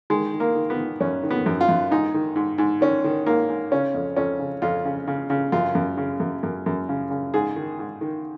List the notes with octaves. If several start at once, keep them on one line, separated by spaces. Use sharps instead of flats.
D#3 G#3
D#3
A#3
D#3
B3
D#3
F#2 C#4
D#3
B3
F#2
F4
F#2
G#2 D#4
D#3
G#2
G#2
D#3 C#4
D#3
G#2 A#3
G#2
C#3 C#4
F2
F2 C#4
C#3
F2 F4
C#3
C#3
C#3
F#2 F4
F#2
C#3
F#2
F#2
F#2
C#3
C#3
G#2 G#4
D#3
G#2
D#3